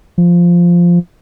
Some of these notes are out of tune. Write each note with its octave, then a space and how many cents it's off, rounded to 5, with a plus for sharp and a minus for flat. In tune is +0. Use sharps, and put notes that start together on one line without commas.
F3 -5